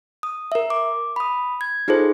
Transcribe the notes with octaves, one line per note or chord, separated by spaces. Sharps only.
D#6
A#4 E5
D6
B5 D#6
G#6
D#4 F4 G#4 A4 C5